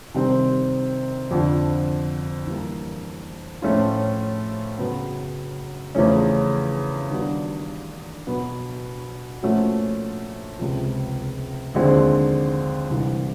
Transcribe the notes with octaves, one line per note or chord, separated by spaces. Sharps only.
C3 D#3 G3 C4
F2 D3 F3
E3 G3 A#3
A2 F3 A3 C#4 F4
F#2 C#3 F#3 B3
E2 C#3 F3 A3 C#4
D#3 G3 B3 D4 F#4
B2 F#3 B3
A#2 F3 A3 C#4 F#4
C#2 C3 F3
D#2 D3 F3 G#3 C4
C2 C3 E3